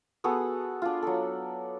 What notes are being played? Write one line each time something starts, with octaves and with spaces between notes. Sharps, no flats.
B3 F#4 G#4 A4
D4 F4
F#3 A4